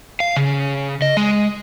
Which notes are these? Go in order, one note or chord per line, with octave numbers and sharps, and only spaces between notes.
F5
C#3
D#5
G#3